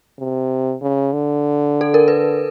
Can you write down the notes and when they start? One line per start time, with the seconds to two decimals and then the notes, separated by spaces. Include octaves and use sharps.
0.19 C3
0.82 C#3
1.13 D3
1.81 A4
1.94 A#4
2.08 B4